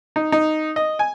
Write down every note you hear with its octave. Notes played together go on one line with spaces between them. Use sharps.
D#4
D#4
D#5
G#5